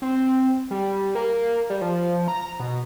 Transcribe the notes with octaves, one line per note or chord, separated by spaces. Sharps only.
C4
G3
A#3
G3
F3
A#5
B2